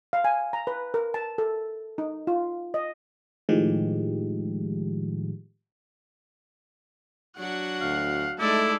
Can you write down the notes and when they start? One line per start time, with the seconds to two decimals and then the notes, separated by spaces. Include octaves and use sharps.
0.13 F5
0.24 G#5
0.53 A#5
0.67 B4
0.94 A#4
1.14 A5
1.38 A4
1.98 D#4
2.27 F4
2.74 D#5
3.49 A2 D#3 F3 G#3 G4
7.38 F#3 D4 F#4 F#5
7.81 D2 F5
8.39 G#3 A3 D#4 E4 A4 D5